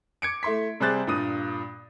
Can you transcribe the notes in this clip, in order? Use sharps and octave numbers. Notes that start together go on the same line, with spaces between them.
D6 G#6 C#7 D7
A3 E4 C6 B6
C3 G3 G#4 C5 F#6 A6
G2 A#2 D#6 D#7